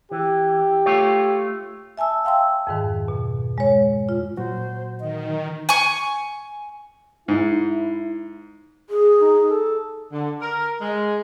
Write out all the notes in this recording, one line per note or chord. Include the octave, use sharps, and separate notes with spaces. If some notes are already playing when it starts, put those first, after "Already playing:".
E3 G4
A3 F4 C#5
E5 G#5 A5 E6
F5 G5 C6 E6
F2 G#2 D#3
B2
G#3 C#5
F4
A#2 F#3 F#4 C5
D#3 D#5
G#5 C#6
G#2 E4
G#4
D#4
A4
D3
A#4
G#3